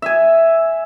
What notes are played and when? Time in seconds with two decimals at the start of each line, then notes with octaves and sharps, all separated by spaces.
0.02 E5 G#5